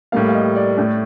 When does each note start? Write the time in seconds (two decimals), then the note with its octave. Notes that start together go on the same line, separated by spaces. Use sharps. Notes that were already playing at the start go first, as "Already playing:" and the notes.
0.12 A2 G3 A#3 F5
0.29 F5
0.34 D#5
0.56 D5
0.77 A2 A3